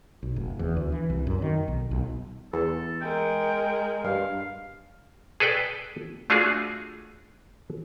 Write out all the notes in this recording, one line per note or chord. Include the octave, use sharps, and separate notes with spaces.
B1
F1
E2
D2
E3
C2
F#2
D#3
B1
B1
E2 A4
G#3 A#4 G5
G2 F5
G#4 A4 B4 D5 G5
A3 D4 F4 F#4 G#4